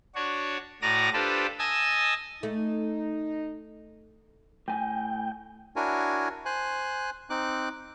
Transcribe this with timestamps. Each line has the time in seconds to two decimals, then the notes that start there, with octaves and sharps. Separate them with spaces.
0.15 D4 F#4 C#5
0.82 A2 F#4 D5 A#5 D#6 A#6
1.13 D4 F4 G4 A4 B4 C5
1.59 D#5 G#5 A5 D#6 E6
2.43 A3 D#4
4.68 A2 G5 G#5
5.76 D4 E4 F#4 A#4 C#5 G#5
6.46 C5 G#5 F#6
7.30 C4 D#4 D6 F#6